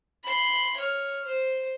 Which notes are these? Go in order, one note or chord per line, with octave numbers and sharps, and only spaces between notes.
B5 C6
C#5 F6
C5